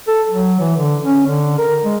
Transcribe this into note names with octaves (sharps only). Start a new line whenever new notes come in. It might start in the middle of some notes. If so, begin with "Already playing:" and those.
A4
F#3
E3
D3
C#4
D3
A#4
G#3